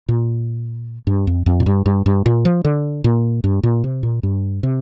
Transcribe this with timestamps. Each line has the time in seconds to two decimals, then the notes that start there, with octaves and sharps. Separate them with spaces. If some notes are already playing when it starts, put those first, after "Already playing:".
0.09 A#2
1.07 G2
1.27 F2
1.46 F2
1.60 A#2
1.66 G2
1.86 G2
2.06 G2
2.26 A#2
2.45 F3
2.65 D3
3.04 A#2
3.44 G2
3.63 A#2
3.84 C3
4.03 A#2
4.23 G2
4.63 C3